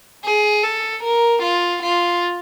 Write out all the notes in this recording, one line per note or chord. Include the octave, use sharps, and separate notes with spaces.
G#4
A4
A#4
F4
F4